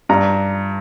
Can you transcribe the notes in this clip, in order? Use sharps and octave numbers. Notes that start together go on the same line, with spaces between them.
G2 A#5